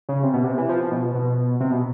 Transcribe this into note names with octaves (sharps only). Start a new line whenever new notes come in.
C#3
C3
B2
C3
E3
F3
B2
B2
C3
B2